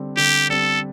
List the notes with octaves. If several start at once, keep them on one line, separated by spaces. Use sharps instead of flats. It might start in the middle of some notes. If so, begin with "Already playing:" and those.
Already playing: D3 G3 C4
D3 G4
G3 C4 A4